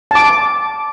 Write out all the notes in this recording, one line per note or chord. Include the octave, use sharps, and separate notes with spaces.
A5 D6